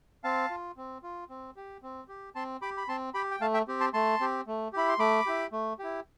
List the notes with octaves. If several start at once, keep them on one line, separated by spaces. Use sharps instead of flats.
C4 F5 A5
F4
C4
F4
C4
G4
C4
G4
C4 A5 C6
G4 B5 D6
B5
C4 A5 C6
G4 G5 B5
G5
A3 F5 A5
E5 G5
C4 G4
A5 C6
A3 A5 C6
C4 G4
A3
E4 G4 B5
C6
A3 B5 D6
E4 G4
A3
E4 G4